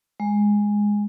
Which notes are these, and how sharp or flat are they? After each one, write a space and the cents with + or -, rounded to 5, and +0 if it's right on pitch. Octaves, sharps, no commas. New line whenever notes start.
G#3 -5